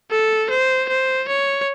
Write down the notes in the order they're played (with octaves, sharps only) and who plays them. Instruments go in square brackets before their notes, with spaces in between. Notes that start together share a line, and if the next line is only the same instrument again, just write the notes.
[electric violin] A4
C5
C5
C#5